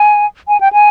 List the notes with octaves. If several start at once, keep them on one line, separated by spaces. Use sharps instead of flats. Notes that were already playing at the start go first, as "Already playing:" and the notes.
Already playing: G#5
G#5
G5
G#5